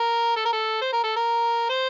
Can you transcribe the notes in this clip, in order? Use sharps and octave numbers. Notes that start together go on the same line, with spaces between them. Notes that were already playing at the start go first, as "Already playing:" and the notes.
Already playing: A#4
A4
A#4
A4
C5
A#4
A4
A#4
C5